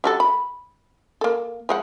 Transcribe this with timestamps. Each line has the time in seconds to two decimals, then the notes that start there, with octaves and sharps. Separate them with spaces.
0.04 G3 F#4 A4
0.20 B5
1.21 A#3 A4
1.69 F3 G#3 F#5